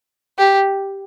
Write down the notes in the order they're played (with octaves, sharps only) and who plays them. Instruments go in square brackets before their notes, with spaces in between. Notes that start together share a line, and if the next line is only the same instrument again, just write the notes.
[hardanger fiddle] G4